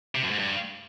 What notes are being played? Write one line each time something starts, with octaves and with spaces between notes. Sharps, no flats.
C3
F#2
G#2
G2